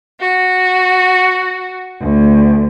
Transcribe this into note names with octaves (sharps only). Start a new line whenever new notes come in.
F#4
D2